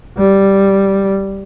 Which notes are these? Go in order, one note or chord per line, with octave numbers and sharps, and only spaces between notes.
G3